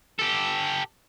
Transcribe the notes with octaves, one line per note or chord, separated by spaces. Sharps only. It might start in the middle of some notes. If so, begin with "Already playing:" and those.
G4 A4